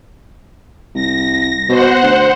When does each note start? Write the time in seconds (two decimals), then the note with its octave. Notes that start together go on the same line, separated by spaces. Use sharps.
0.94 C2 A#6
1.69 B2 C5 F#5
2.03 D2